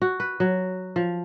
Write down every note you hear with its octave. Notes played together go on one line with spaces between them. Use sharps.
F#4
B4
F#3
F3